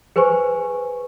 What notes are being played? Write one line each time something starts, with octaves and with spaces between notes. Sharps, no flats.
G#4 B4 C5 G#5 C#6